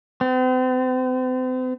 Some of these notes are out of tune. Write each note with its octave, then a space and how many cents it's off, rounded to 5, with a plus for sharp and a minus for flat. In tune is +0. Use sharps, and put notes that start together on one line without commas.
C4 -40